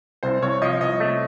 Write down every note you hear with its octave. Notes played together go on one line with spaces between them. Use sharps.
C2 C5
C2 C#5
F3 D#5
C2 D#5
A3